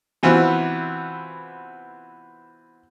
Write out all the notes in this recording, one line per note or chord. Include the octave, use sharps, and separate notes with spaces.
C3 E3 B3 C4 F4 F#4